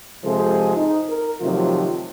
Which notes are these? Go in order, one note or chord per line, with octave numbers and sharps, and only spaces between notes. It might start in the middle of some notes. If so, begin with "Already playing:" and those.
C3 F3 G#3 G#4 A4 C5
D#4
A#4
C3 D#3 F3 F#3 A3 F4